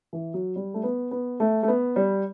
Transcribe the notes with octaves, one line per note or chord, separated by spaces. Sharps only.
E3
F#3
G3
A3
B3
B3
A3
A3
B3
G3